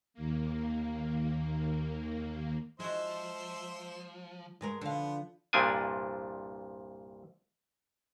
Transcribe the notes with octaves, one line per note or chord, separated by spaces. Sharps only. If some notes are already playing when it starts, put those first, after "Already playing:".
D#2 A#3
F3 G#3 F#4 C5 E5 C6
G2 G#3 A#4
D3 F3 B3 F5
C2 G2 A#2 F3 D4 G#5